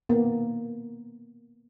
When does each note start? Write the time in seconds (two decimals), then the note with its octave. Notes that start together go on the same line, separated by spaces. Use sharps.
0.09 A#3 B3